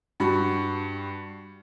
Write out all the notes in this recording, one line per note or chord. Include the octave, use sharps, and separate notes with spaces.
G2 F#4 B5 C#6